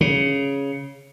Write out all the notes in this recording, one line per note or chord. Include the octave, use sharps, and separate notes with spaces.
C#3